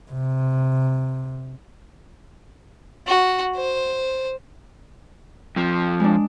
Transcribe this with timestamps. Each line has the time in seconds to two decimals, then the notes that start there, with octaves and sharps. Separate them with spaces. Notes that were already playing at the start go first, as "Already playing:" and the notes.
0.11 C3
3.07 F#4
3.56 C5
5.56 F2 F3
6.00 G#3 D4